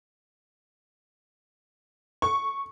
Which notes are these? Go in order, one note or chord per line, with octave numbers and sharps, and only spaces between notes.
C#6